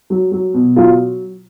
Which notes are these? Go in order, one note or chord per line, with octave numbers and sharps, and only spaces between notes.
F#3
F#3
B2
F#3 F4